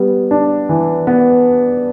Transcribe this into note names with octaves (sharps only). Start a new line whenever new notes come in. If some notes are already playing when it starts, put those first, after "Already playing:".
Already playing: G3 B3
D4
E3
B3